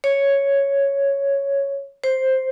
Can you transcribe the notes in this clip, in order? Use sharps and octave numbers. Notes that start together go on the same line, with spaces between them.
C#5
C5